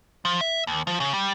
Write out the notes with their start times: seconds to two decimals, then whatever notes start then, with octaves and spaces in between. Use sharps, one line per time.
0.25 F3
0.41 E5
0.67 D#2
0.87 F3
1.00 C#3
1.14 G3